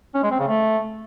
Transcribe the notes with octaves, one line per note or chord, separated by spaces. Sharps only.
C#4
G#3
C4
C#3
A3